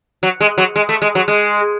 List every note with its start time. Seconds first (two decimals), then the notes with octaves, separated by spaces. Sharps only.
0.23 F#3
0.41 G#3
0.58 F#3
0.76 G#3
0.89 A3
1.02 G#3
1.15 F#3
1.28 G#3